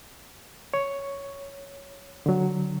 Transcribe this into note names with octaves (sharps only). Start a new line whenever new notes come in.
C#5
D3 F#3